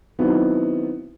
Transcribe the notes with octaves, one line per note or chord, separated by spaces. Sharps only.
D#3 F#3 B3 C4 D#4 E4